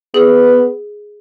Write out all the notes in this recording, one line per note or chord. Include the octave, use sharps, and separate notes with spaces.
B3 G#4